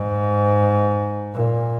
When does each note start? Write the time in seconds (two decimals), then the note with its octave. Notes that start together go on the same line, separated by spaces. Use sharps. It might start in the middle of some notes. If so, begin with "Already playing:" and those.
Already playing: G#2
1.33 A#2